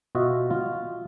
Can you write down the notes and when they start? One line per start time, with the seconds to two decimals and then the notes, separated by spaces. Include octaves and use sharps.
0.15 B2 F4 F#4 D#5 E5
0.51 F4